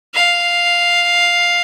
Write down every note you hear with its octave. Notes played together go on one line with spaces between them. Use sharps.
F5